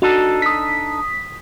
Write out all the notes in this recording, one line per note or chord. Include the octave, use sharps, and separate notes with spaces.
D4 D#4 F#4 A4
D#6 B6